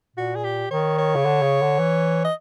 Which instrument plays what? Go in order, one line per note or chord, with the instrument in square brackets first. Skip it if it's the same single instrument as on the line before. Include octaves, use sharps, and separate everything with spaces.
[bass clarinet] A#2 [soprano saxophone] F#4
[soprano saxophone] G#4
G4
[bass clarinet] D#3 [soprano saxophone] C#5
[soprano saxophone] C#5
[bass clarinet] C#3
D3
C#3
D3
E3
[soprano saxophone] D#5